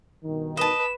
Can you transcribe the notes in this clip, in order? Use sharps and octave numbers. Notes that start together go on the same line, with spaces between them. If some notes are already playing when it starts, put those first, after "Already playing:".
G2 B2 D#3
B4 D#5 A5 E7